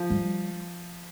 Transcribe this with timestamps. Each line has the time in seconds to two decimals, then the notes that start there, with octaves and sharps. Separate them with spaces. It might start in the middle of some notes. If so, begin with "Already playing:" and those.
Already playing: F3
0.10 G3